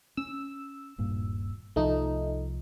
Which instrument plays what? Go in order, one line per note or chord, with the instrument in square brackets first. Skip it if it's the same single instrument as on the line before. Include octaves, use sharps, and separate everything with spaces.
[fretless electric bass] C#4 [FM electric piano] E6
[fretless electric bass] D#1 G2 A#2
[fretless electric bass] C2 F3 [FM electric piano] A3 D#4